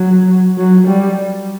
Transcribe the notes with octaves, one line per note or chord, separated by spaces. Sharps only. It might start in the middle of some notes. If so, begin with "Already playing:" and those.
Already playing: F#3
F#3
G3